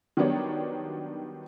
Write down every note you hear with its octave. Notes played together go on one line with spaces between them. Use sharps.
D#3 F#3 G3 B3 D4 C#5